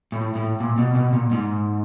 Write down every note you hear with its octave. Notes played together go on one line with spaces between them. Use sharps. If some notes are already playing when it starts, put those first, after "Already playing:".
A2
A2
A#2
B2
B2
A#2
G#2